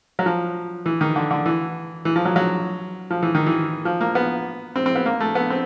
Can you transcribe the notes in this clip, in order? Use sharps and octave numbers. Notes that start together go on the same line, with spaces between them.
F#3
F3
E3
D#3
D3
D3
E3
E3
F3
F#3
F#3
F3
E3
D#3
E3
F3
A#3
B3
C4
C4
B3
A#3
A3
B3
C4